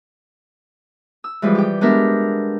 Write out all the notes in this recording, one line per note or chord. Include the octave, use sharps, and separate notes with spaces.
E6
E3 F3 G3 G#3 B4
G4 G5
G#3 B3 D4 G4 A#4 E5